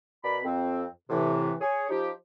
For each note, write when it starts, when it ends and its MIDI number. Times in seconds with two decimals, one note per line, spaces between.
0.24 0.39 47
0.24 0.39 70
0.24 0.39 74
0.24 0.39 83
0.44 0.85 41
0.44 0.85 60
1.10 1.54 45
1.10 1.54 48
1.10 1.54 52
1.61 1.87 68
1.61 1.87 73
1.89 2.10 53
1.89 2.10 63
1.89 2.10 67